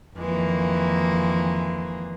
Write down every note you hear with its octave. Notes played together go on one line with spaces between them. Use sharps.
F2 D#3 E3 G#3 A#3